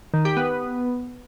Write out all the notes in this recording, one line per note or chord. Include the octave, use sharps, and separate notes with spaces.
D#3
G4
B3